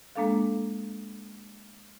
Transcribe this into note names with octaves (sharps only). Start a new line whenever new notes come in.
G#3 A#3 D4 A4 F5